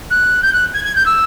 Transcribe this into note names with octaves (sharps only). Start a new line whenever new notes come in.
F#6
G6
F#6
G#6
G#6
G6
E6